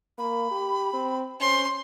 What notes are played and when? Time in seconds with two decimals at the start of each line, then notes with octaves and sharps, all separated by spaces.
0.19 A#3 B5
0.51 G4
0.93 C4
1.41 C#4 C5 C6